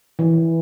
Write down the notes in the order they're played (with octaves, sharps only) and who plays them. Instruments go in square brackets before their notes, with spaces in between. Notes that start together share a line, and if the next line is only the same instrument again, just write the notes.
[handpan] E3